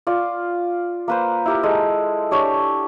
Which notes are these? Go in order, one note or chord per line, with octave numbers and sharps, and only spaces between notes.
F4 D5
A#3 B4 C5
E4 G4 A#4
G#3 A4
D4 G4 C#5